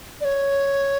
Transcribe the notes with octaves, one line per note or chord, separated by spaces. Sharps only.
D5
C#5